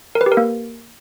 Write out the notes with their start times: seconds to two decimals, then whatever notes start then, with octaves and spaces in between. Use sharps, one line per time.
0.15 A#4
0.21 B4
0.26 G4
0.32 A#4
0.37 A#3